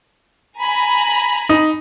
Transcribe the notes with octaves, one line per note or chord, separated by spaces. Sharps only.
G#5 A#5 B5
D#4